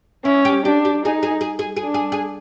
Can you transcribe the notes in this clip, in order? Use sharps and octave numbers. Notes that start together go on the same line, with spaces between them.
C#4 E4
G4
D4 G4
G4
D#4 G#4
G#4
G#4
G#4
G#4
D4
G#4
G#4